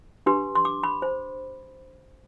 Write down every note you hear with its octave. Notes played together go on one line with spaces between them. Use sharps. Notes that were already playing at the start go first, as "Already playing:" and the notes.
D4 G4 B4 C6
C6
D6
B5
C5